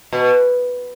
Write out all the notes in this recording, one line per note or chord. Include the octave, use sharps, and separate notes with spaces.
B2